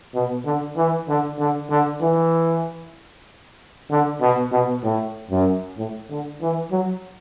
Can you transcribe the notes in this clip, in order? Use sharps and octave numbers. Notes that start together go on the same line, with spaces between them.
B2
D3
E3
D3
D3
D3
E3
D3
B2
B2
A2
F#2
A2
D3
E3
F#3